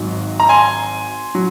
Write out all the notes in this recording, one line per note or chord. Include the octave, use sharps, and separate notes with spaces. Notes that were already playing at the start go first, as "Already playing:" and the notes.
Already playing: G#1 G#2 F#3
A#5
G#5 C6
F#3